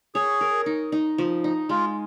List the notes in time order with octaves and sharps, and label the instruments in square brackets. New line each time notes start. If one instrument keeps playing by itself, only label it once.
[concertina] G#4 [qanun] C#5
[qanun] A#4
D#4
D#4
F3
D#4
[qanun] G#3 [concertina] F4